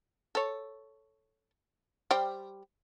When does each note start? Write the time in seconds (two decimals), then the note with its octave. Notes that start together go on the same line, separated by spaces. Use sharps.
0.35 A4 C#5
2.11 G3 C5 G5